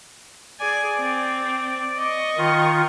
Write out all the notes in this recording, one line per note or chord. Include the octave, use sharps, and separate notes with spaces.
G#4 D5 G#5
C4
D#5 C#6
D#3 F4